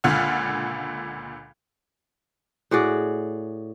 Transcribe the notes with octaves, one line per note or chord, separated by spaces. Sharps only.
C#2 A#2 D3 F#5 F6
A2 F#4 G#4 D5